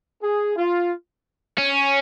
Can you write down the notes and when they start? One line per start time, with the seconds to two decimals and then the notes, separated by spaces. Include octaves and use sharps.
0.23 G#4
0.56 F4
1.58 C#4